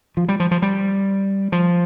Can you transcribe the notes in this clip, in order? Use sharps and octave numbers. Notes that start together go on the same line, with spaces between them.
F3
G3
F3
F3
G3
F3